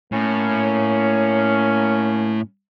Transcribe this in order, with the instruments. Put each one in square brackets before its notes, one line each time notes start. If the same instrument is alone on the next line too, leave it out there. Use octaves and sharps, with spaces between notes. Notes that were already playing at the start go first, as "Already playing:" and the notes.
[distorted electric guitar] A2 [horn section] A#3 C#4